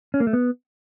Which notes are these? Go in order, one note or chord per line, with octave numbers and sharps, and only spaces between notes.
C#4
A#3
A3
B3